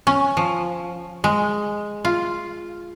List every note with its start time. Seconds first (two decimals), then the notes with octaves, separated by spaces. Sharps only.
0.07 C#4
0.37 F3
1.24 G#3
2.05 F4